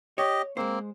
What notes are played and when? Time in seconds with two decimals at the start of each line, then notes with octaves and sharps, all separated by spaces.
0.18 G4 C#5 D#5
0.57 G#3 A#3 C4 C5